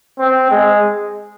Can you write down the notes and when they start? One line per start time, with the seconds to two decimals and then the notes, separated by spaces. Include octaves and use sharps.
0.19 C4
0.51 G#3